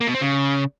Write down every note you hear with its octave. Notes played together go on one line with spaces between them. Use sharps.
A#3
B2
C4
C#3